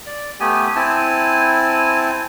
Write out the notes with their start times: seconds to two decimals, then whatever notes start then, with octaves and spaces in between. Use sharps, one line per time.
0.06 D5
0.40 A3 B3 G4 G#5
0.76 C4 E4 G#5 A5